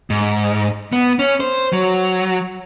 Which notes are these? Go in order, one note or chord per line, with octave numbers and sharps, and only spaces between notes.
G#2
B3
C#4
C5
F#3